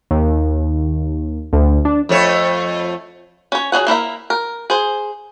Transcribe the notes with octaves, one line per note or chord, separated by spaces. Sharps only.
D#2
D2
D4
F2 A3 C#5
C#4 C#5
F#3 C#4 G#4 F#5
A#3 E4 A#4 E5
A#4
G#4 C5